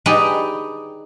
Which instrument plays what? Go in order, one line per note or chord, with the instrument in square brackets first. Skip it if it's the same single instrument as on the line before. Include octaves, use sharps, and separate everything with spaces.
[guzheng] D#4 G4 G#4 B4 D5 D#5